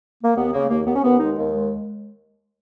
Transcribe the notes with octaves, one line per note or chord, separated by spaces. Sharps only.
A#3
D#2 B3
C#3 A#3
D#2 A#3
D#2 B3
C#4
D#2 B3
G#3 D#4
D#2
G#3